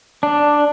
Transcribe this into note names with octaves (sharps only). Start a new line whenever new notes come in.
D4